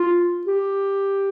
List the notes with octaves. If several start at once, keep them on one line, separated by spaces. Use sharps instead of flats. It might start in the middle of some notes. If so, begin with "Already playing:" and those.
Already playing: F4
G4